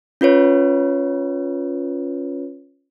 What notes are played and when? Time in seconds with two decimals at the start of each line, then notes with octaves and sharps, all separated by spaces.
0.21 C#4 F4 B4 C#5